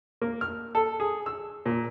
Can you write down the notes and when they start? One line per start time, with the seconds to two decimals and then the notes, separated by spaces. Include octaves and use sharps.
0.22 A#3
0.41 F6
0.75 A4
1.00 G#4
1.26 E6
1.66 A#2